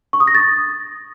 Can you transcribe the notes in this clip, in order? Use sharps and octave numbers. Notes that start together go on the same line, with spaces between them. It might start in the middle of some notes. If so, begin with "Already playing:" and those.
C#6
D#6
A#6
A6